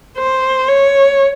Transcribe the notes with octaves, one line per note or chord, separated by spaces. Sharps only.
C5
C#5